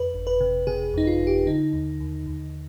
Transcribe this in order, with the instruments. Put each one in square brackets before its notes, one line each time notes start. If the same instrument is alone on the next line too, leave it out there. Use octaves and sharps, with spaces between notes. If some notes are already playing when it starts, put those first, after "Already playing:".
Already playing: [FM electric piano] F2 B4
G1
B4
C3
C3 G#4
F2 D#4
F4
G1
G4
D3 D#4
D#2
D#2
D#2